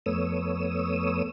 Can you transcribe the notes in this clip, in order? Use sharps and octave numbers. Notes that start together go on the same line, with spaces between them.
F2 A3 B3 C#5 D#6 E6